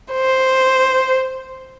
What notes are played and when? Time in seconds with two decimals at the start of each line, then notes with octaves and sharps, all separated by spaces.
0.13 C5